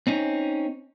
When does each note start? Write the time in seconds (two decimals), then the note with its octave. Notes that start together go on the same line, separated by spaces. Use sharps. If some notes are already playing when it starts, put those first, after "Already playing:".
0.07 C4 C#4 D#4